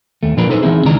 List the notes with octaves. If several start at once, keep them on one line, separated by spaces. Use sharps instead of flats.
D#2 A3
A#2 F3 D4 A#4 B4
D#4 A4 B4 C5
E3 G3 C4 D#4 E4 G#4
C#2 D#3 E3 D4 A#5